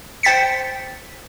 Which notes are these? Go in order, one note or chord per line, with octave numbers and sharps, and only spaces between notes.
C5 G5 A6 B6 C#7